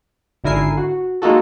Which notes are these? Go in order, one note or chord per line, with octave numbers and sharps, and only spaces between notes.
G#1 D3 E4 A#4 G#5 C7
F#4
G#3 A#3 D#4 F4 F#4 A4